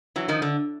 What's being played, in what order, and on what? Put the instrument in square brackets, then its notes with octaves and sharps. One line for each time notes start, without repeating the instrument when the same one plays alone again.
[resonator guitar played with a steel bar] E3 F#3
D#3 F3
D3